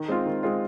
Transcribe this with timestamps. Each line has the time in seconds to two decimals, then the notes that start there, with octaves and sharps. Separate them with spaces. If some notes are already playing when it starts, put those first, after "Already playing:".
Already playing: D#3
0.08 G#3 C4 F4
0.25 D#3
0.43 G#3 C4 F4